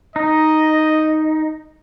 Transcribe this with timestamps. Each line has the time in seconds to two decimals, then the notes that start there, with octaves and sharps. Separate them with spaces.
0.16 D#4 D#5